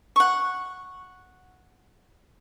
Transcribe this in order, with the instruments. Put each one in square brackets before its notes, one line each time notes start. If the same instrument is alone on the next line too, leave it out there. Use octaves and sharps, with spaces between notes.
[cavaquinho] F#5 C#6